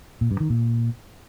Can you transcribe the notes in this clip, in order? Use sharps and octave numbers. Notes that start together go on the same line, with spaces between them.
A#2
G2
D#3
A#2